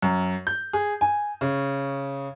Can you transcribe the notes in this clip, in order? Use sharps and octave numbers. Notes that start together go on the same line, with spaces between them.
F#2
G6
G#4
G#5
C#3